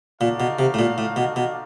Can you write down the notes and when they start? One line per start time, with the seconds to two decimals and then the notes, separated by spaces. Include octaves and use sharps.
0.21 A#2 D#4 F#4 A4 D5 F5
0.40 B2
0.59 C3
0.74 A2
0.79 A#2
0.98 A2
1.16 B2
1.36 B2